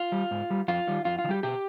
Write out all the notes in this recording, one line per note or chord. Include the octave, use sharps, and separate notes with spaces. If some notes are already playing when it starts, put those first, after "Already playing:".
Already playing: F4
G3
G#2
G3
F2 F4
D#3 G3
F2 F4
F4
D#3
G3 G4
B2 G4